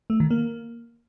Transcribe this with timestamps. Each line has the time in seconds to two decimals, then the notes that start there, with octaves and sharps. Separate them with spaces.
0.10 A3
0.20 D#3
0.30 A#3